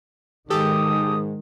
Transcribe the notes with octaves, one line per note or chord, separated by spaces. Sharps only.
G#2 D#3 G#3 G4 A4 D#6